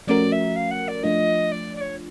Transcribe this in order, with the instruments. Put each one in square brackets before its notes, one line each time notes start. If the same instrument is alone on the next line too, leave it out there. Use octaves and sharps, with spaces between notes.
[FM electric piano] F3 A3 C#4 F#4 A#4 [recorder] D5
[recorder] E5
F5
F#5
D5
[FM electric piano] F3 A3 D4 F4 [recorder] D#5
[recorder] D5
D5
C#5